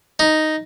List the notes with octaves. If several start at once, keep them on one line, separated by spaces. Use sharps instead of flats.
D#4